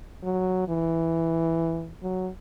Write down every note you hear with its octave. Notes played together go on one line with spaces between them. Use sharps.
F#3
E3
F#3